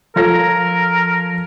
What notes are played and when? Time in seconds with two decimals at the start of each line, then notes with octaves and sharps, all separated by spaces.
0.16 F3 F4 A4 A#4 C#5 A5 A#6